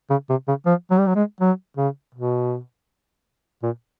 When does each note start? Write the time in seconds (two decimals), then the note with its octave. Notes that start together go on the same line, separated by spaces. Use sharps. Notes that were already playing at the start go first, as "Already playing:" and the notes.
0.10 C#3
0.29 C3
0.48 C#3
0.66 F3
0.91 F#3
0.98 G3
1.07 F#3
1.15 G#3
1.40 F#3
1.77 C#3
2.15 B2
3.63 A#2